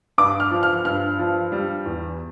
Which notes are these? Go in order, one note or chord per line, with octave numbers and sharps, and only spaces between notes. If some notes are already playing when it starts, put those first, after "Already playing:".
G2 D6
F6
F3
F6
G2 F6
F3
G3
E2